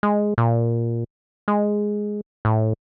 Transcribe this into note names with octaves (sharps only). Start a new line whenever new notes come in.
G#3
A#2
G#3
A2